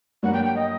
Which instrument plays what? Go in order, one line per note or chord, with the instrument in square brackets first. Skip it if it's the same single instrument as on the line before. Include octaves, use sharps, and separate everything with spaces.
[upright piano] G2 F#3 A#3 F#4 [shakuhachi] F#5
[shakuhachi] G5
G5
D#5